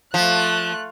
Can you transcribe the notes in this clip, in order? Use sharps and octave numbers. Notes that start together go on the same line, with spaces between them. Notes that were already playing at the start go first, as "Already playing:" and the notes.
F3 A3 F#6